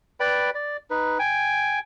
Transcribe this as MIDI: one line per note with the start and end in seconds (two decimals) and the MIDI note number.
0.20 0.50 71
0.20 0.50 74
0.20 0.50 79
0.20 0.50 83
0.55 0.77 74
0.90 1.18 63
0.90 1.18 71
1.19 1.79 79
1.19 1.79 80